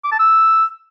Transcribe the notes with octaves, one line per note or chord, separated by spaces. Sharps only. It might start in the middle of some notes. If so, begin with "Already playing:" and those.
D6
A5
E6